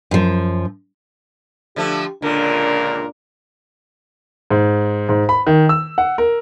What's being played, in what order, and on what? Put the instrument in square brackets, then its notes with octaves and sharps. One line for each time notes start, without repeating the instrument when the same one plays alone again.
[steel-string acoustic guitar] F#2 F3
[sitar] D3 F3 A3 [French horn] G4
[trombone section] C#2 A#2 A#4 [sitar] D3 [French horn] D4
[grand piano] G#2
G#2
B5
D#3
E6
F#5
A#4